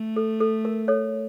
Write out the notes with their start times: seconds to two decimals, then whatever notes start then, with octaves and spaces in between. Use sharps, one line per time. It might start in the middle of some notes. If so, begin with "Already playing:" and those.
Already playing: A3
0.16 A4
0.40 A4
0.65 A#4
0.88 A4 C#5